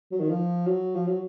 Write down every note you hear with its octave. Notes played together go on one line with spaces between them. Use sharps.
F#3
D#3
F3
F#3
F3
F#3